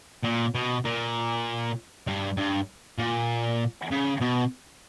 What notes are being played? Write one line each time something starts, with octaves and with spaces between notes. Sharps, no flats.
A#2
B2
A#2
G2
G2
A#2
C#3
B2